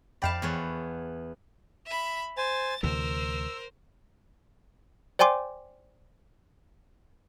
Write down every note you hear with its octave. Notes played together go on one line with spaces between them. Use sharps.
F2 D5 F5 G5 A5 B5
E2 B3 C#5
E5 B5
C5 G#5 A6
D2 C3 E3 A#4 C5 E6
C5 D5 G5 G#5 C6 D6